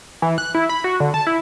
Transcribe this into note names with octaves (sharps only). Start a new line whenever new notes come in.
E3
F#6
E4
B5
F#4
D3
A5
E4